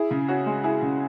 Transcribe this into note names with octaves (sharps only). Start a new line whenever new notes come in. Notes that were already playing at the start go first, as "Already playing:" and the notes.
Already playing: E4 G#4
C#3
C#4 F#4
G#3
E4 G#4
C#3